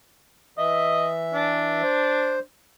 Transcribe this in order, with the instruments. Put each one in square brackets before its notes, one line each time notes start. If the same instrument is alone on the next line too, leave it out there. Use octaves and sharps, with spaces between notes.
[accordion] E3 E5 [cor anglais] D#5
[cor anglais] D4
[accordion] C5